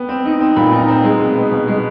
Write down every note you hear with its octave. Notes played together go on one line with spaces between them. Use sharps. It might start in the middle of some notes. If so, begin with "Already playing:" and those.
Already playing: B3 G5
C4
D#4
C4
A#2 B5
D#4
A#5
C4
G#3
B2
B3
B2
G#3